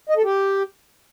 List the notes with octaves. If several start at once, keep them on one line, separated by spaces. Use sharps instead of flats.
D#5
A4
G4